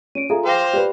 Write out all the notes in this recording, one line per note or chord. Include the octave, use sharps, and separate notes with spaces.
C#4 D7 D#7
F4 G#4 A4 E5 A#5
C5 F5 G5 C6 D6 A#6
G4 B4 D5